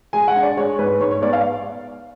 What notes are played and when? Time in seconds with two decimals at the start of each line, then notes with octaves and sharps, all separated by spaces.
0.13 G#3 G#5
0.28 F#5
0.36 D4
0.43 D5
0.57 G#3 C#5
0.79 G#2 B4
1.01 G#2 C#5
1.11 C#5
1.22 B3 D5
1.33 F5